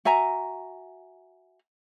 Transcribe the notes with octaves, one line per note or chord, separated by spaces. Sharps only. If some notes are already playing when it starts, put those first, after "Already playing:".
F#4 E5 G#5 A#5